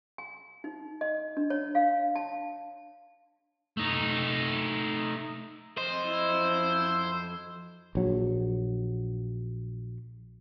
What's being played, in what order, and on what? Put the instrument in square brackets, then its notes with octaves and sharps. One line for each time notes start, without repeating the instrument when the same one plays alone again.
[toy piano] G#5
D#4
D#5
D4
C#5
F5
A5
[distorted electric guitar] A3 D#4
[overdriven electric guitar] F2 D#5 [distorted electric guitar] C5
[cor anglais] E4
[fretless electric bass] A#1 F#3